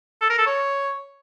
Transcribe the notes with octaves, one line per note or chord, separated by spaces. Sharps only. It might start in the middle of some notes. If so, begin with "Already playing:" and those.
A4
A#4
A4
C#5